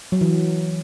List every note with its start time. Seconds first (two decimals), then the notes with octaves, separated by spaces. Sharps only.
0.12 F#3
0.21 E3